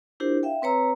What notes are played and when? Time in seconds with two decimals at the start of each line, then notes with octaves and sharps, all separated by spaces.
0.20 D4 E4 F4 G4 A#4 C5
0.43 E5 F5 G5
0.62 C4 B4 C#5 A#5 C6 E6